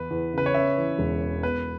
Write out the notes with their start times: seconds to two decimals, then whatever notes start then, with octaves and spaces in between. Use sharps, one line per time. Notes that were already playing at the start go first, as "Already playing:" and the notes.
Already playing: E2 E3 B4
0.10 E2
0.34 C#3 B4
0.46 C#5
0.54 C#4 E5
0.77 E3
0.99 E1
1.21 E2
1.43 B3 B4